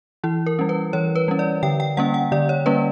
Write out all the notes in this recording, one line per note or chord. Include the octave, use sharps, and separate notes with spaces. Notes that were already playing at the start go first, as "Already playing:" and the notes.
E3 E4
A#4
G3 C#4
B4
E3 C#5
B4
G3 C#4
D5
D3 G5
G5
G3 A#3 C#4 F#5
F#5
D3 D5
C#5
G3 A#3 C#4 B4